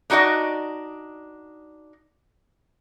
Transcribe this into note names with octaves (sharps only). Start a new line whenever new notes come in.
D4 D#4 F#4 D5 D#5